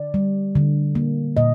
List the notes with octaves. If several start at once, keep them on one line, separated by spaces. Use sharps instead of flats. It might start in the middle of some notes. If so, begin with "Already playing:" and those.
Already playing: D3 D5
G3
D3
A#3
A#2 D#5